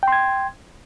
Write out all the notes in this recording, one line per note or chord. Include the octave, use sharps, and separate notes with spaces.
G5 C6 G#6